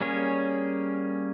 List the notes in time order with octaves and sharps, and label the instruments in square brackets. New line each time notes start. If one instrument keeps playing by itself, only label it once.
[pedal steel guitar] G3 A#3 C#4 G#4 C#5